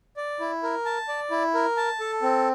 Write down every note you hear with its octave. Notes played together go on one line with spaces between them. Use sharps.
D5
E4
A#4
A5
D5
E4
A#4
A5
A4
C4